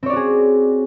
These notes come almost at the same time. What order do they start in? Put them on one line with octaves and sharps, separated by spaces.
C4 C#5 D5 F#4 G#4